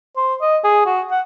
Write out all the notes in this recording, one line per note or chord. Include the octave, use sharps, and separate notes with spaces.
C5
D#5
G#4
F#4
F#5